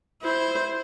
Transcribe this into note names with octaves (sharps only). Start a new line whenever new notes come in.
E4 C5